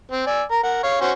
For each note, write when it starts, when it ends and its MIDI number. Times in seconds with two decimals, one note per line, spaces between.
0.11 0.26 60
0.26 0.43 74
0.26 0.43 80
0.26 0.43 88
0.51 0.60 70
0.51 0.60 82
0.63 0.81 70
0.63 0.81 78
0.83 1.00 73
0.83 1.00 77
1.01 1.11 61
1.01 1.11 66
1.01 1.11 72